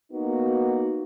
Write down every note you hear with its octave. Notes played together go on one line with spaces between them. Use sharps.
A#3 B3 D#4 F#4